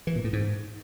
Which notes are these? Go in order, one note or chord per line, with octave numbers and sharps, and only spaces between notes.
E3
A#2
A2
G#2